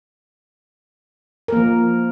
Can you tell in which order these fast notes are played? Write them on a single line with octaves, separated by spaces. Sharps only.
A#4 A#3 F3